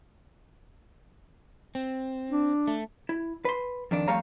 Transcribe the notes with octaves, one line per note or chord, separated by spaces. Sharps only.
C4
D4
A3
E4
B4 C6
F2 D#3 D4
F2 G3 A3 C#5 F5 A#5